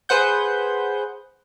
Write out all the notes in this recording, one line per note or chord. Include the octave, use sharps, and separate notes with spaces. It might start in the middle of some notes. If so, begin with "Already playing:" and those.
G#4 B4 C5 F#5 G6